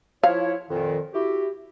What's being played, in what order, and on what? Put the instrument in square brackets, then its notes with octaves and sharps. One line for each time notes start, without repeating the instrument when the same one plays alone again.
[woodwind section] F3 E4 C#5 [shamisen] F5
[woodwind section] F2 A#2 D#3
E4 F#4 G4